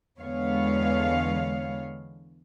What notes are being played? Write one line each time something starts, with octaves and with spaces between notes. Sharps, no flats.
E2 D3 G#3 B3 C#5 F5